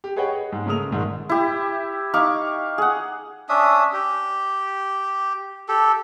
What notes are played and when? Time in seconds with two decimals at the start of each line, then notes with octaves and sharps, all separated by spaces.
0.04 G4
0.16 G#4 B4 C#5 D#5 F#5 G5
0.35 G#4
0.52 G#2
0.66 C#3 G#3 A3 A#4 D#6 F7
0.90 A#1 G#2 D#3
1.29 E4 G4
2.14 D#4 F5 C#6 D6
2.78 G#4 F#5
3.49 C#4 D4 E5 D#6
3.93 G4
5.69 G4 A4